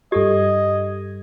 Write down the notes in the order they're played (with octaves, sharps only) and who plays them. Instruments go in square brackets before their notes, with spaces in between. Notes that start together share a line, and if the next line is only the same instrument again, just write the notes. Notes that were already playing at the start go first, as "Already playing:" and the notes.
[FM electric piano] G2 G#6 [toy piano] G4 A4 [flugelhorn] D#5